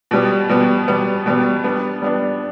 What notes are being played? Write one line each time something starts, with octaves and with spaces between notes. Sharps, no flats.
B2 G3 B3
B2 G3 B3
B2 G3 B3
B2 G3 B3
G3 B3 D4
G3 B3 D4